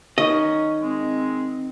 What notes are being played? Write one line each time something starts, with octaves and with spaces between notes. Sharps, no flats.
D#3 C#4 D#5
G#3 C4